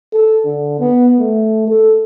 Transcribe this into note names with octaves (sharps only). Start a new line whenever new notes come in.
A4
D3
B3
A3
A4